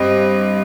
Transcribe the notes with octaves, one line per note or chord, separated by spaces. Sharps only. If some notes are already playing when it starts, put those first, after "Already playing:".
Already playing: G2 C4 D#5